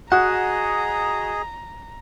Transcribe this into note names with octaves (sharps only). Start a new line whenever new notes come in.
F#4 G#4 D#5 F#5 A#5